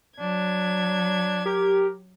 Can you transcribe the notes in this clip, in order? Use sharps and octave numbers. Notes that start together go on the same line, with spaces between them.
F#3 D4 G#6
G4 A#4